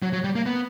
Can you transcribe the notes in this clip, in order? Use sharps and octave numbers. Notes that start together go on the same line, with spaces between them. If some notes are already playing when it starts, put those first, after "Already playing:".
F#3
F#3
G3
A#3
B3